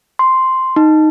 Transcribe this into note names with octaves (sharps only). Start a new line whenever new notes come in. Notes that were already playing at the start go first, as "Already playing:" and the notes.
C6
D#4